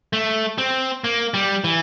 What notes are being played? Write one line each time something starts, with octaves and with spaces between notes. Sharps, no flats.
A3
C4
A#3
G3
E3